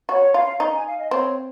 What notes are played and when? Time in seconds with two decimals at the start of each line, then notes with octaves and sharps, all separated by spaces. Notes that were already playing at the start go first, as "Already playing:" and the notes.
0.09 F#4 C#5
0.34 F4 F5
0.60 D#4
0.74 G#5
0.86 F5
0.98 D#5
1.11 C4 C#5